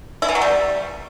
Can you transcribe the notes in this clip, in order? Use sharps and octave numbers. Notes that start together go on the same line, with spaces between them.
E4
E3
F#3
G3